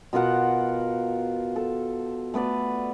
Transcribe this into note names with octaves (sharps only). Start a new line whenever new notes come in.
B2 F4 A#4 F#5
A4
A3 B3 B4 D5